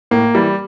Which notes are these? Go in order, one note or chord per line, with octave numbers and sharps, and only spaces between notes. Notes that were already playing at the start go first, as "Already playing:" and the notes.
A2 A#3
E3 G3